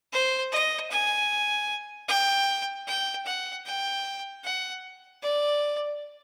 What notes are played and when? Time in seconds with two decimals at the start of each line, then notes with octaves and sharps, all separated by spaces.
0.12 C5
0.52 D#5
0.91 G#5
2.08 G5
2.87 G5
3.26 F#5
3.65 G5
4.44 F#5
5.22 D5